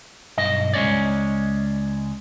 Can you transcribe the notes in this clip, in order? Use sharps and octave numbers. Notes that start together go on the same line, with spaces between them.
B1 G2 D#5
C#2 G#3 C#4 C#5 D5